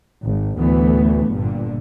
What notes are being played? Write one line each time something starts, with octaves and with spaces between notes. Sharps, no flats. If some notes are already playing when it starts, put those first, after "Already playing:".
G#1
D2 A2 E3 A3 B3
G1 G2 A#2 D3